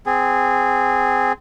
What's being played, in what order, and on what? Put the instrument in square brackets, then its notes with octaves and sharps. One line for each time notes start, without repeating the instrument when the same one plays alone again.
[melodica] C4 G#4